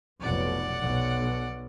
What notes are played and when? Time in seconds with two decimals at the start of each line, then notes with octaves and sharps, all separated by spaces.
0.21 F1 B1 D5 F#5
0.81 B1